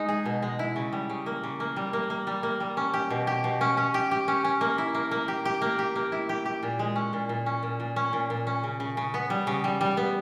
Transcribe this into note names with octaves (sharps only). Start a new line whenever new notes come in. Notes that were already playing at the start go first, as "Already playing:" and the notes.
Already playing: G#3 D#4
G#4
B2
G#3
E4
C#3
G3
C#3
A#3
C#3
A#3
G3
A#3
A#3
G3
A#3
G3
C#4
G4
B2
G4
B2
C#4
C#4
G4
G4
C#4
C#4
A#3
E4
A#3
A#3
G4
G4
A#3
G4
A#3
E4
G4
G4
A#2
G#3
C#4
A#2
A#2
C#4
A#2
A#2
C#4
A#2
A#2
C#4
C#3
C#3
C#3
B3
G3
C#3
G3
G3
B3